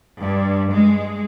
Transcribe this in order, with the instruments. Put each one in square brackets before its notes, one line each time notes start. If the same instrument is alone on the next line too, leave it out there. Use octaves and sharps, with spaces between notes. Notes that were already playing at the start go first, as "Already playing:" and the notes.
[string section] G2
G#3